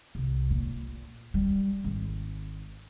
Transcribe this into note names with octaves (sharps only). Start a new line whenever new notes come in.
C2
A#2
G3
G#1